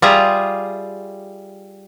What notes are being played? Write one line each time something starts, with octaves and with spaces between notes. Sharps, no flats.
G3 F4 G#4 E5 A#5